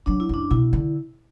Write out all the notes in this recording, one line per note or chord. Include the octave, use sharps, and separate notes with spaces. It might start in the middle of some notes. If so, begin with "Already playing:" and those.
F#3 D4
E4
F#2 D4
B2 E4
D3